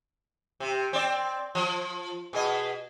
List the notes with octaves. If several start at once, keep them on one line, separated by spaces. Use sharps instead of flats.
C3
C4 D5
F3
B2 G#4 D#5